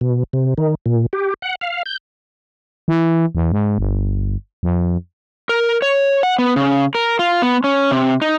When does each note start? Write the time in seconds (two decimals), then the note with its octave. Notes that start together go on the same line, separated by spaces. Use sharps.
0.01 B2
0.33 C3
0.58 D#3
0.86 A#2
1.13 G4
1.42 F#5
1.61 F5
1.86 G6
2.88 E3
3.35 E2
3.52 G#2
3.78 G1
4.63 F2
5.49 A#4
5.82 C#5
6.23 F#5
6.39 B3
6.56 C#3
6.95 A#4
7.19 F4
7.42 B3
7.64 C#4
7.91 C3
8.22 D#4